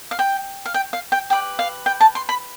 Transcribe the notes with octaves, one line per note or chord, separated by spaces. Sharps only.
F5
G5
F5
G5
F5
G5
G4 B4 D5 G5
F5
G5
A5
C6
B5